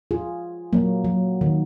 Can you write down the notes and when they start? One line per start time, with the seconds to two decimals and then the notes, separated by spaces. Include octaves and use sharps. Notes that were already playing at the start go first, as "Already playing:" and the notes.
0.11 F4 G#4
0.73 F#3 A#3
1.05 F#3
1.41 D#3